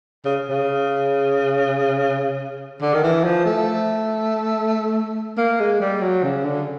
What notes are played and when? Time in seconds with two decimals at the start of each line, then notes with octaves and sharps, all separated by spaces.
0.25 C#3
0.49 C#3
2.81 D3
2.93 D#3
3.03 E3
3.24 F3
3.45 A3
5.37 A#3
5.60 G#3
5.80 G3
6.02 F#3
6.23 C#3
6.44 D3